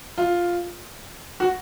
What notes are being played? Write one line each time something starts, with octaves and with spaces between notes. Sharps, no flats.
F4
F#4